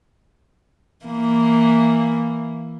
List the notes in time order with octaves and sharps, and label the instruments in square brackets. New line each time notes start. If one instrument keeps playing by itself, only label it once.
[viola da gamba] E3 A#3